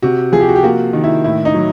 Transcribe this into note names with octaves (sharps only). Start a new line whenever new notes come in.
C3 F#4
F3 G#4
G4
F#4
G4
A#3 F#4
D#3
E4
A2 E4
D#4
F#3